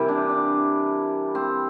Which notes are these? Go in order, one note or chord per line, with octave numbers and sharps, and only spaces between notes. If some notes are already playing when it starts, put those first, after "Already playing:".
Already playing: C3 E3 G3 A#3 E4
D4
D4
C4